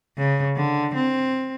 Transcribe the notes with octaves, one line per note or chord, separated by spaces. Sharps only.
C#3
D3
C4